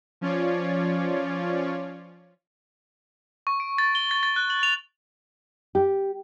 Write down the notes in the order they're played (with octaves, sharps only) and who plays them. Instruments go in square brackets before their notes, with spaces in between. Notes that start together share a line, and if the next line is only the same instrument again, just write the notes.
[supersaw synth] F3 C#4 F4 C#5 D5
[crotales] C#6
D7
A6
G7
A6
A6
F#6
F#7
F7
[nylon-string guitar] G4